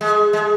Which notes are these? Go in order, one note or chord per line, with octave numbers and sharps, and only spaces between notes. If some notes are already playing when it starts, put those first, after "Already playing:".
G#3
G#3